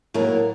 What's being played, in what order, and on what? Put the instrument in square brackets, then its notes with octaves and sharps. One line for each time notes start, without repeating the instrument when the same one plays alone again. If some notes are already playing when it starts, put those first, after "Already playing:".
[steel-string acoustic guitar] A2 F#3 A#3 D#4 A#4